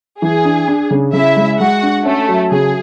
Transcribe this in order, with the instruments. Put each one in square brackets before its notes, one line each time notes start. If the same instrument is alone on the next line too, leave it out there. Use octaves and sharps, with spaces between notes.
[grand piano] E3 [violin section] G#4
[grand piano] D4
D4
C#3
[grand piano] C#3 [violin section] E4 E5
[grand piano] G#3
[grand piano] G#3 [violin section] F#4 F#5
[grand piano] D4
[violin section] A3 A4 [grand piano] C#4
[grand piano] F#3
[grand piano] C#3 [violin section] G#4